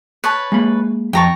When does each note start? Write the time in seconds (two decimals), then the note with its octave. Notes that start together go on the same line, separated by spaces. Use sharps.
0.24 B4 C#5 A5
0.52 G#3 A#3 B5
1.13 F2 G4 G5 A5 A#5 C#6